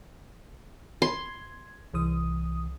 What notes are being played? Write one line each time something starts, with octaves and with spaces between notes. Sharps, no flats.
C6 G#6
C2 E3 D#6